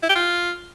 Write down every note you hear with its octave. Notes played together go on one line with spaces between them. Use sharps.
E4
G4
F4